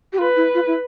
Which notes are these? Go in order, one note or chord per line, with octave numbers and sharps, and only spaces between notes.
G4
F4 B4
E4
F4
E4